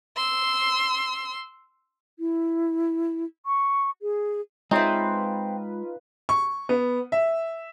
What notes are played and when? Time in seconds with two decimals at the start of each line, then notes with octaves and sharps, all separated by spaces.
0.16 C6 E6
2.19 E4
3.46 C#6
4.02 G#4
4.71 G#3 C4 D#4 F4 B4 C#5 E5
6.29 C#6
6.69 B3
7.12 E5